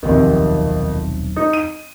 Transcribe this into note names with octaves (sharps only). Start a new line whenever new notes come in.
D#1 B1 F2 C3 D#3
D#4
D#7